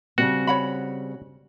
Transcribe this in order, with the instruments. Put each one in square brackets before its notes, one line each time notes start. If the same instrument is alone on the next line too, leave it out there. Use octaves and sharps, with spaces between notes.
[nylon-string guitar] C#3 G3 C4 [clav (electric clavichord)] F#4
[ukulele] C#5 F#5 B5